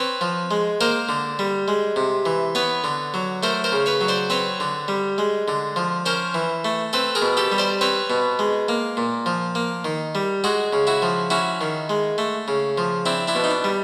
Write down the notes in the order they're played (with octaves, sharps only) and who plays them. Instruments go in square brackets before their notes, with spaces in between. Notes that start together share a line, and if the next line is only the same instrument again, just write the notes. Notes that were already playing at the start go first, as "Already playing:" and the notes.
Already playing: [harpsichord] C4 B4 C#5
F3
G#3
A#3 A#4 C5
D3
G3
G#3
C3
E3
B3 B4 C#5
D3
F#3
A3 A#4 C5
A#4 C5
C#3
B4 C#5
F#3
C5 D5
C4 B4 C#5
D3
G3
G#3
D3
F3
C#4 A#4 C5
E3
A3
C4 A4 B4
G#4 A#4
B2
G4 A4
G3
C5 D5
C4 B4 C#5
B2
G#3
A#3
A#2
F3
A#3
D#3
G3
G#3 F#4 G#4
C#3
E4 F#4
F3
C#4 E4 F#4
D#3
G#3
A3
C#3
F3
C4 D4 E4
D4 E4
B2
D#4
D4
G3